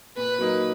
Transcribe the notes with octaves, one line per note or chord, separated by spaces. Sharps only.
A#2 B4
F#3 A#3 D#4